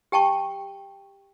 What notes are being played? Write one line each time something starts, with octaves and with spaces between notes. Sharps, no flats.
G4 G5 A5 C#6